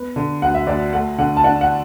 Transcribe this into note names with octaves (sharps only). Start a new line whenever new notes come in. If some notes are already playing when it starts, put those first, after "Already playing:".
Already playing: B3
D3
D2 F#5
E5
D2 D5
A3 F#5
D3 F#5
A5
D4 F#5
F#5